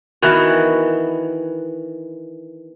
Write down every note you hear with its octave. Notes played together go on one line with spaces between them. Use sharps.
D#3 E3 B3 F#4